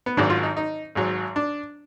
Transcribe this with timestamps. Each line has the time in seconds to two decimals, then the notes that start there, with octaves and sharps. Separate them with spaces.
0.06 B3
0.17 G#1 G#2 D#3 F#3 D4
0.30 F4
0.43 D#4
0.57 D#4
0.95 G#1 G#2 F#3
1.36 D4